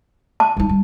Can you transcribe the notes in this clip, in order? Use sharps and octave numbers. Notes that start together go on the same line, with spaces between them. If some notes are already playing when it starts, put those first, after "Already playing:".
A5
G3 D#4
G3